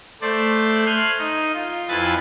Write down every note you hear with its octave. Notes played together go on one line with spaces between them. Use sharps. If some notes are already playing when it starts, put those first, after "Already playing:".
A3 C5 D5
G#5 C6 F6 F#6
D#4 D#5
F4
F2 F3 E4 B4 G#5 A6